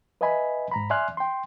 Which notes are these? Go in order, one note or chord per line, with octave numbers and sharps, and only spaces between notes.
B4 D#5 E5 G#5 B5
G#2 A#5 B5
D5 E5 G#5 C6 F6 F#6
G5 C6